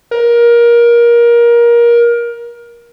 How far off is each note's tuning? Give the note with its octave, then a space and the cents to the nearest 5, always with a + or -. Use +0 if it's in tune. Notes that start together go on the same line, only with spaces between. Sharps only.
A#4 +20